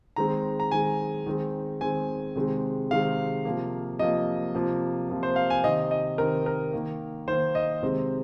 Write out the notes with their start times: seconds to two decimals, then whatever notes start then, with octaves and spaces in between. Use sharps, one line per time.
0.16 D#3 G#3 C4 A#5
0.60 A#5
0.71 D#3 G#3 C4 G#5
1.26 D#3 G#3 C4
1.81 D#3 G#3 C4 G#5
2.36 C3 D#3 G#3 C4
2.91 C3 D#3 G#3 C4 F5
3.45 C3 F3 A#3
3.99 C3 F3 A#3 D#5
4.55 C3 F3 A#3
5.09 C3 F3 A#3
5.23 C5
5.36 F5
5.50 G#5
5.63 C3 D#3 C4 D#5
5.91 D#5
6.18 C3 D#3 C4 A#4
6.46 A#4
6.73 D#3 A#3
7.28 D#3 C5
7.32 A#3
7.55 D#5
7.83 C3 D#3 G#3 C4